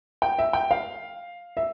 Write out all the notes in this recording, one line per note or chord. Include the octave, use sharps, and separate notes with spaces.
G5
E5
G5
F5
E5